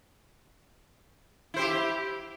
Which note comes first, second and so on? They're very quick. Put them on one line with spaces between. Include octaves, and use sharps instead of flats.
E4 C5 G4